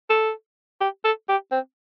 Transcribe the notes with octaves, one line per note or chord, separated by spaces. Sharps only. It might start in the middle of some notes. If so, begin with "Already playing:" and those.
A4
G4
A4
G4
C4